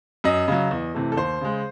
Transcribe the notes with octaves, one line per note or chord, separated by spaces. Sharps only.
F#2 D#5
C#3 F#3
E2
C3 E3 A3
A4
D#2 C5
C#3 G#3